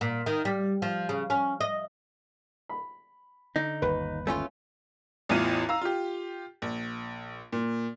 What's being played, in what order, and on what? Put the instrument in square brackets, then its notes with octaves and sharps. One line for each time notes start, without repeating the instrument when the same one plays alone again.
[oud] A#2
D#3
G3
F3
C#3
C#4
D#5
[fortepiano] B5
[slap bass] D3 [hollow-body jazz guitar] D#4
[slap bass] G1 D#2 [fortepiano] B4
[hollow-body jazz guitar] A3 C#4 F4
[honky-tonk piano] A1 E2 E3 F4 D#7
F5 A#5 E6
F4 G4
A#1
A#2